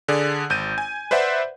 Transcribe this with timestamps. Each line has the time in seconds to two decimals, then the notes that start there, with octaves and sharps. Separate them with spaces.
0.08 D3 G#4 D5
0.50 G#1 G6 D#7
0.78 G#5
1.11 B4 C5 D5 E5 F#5